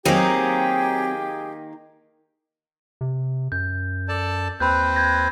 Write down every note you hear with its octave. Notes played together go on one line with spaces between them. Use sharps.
D#3 F#3 A#3 C4 D#4 G4 G#4
C3
F#2 G6
A4 D5 A5
D#2 C4 B4 C5 B5 F#6 G6
G6 G#6 A#6